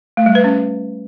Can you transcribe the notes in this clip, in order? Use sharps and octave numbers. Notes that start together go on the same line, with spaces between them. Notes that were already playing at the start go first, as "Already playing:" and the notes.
A3
G3
B4
C#4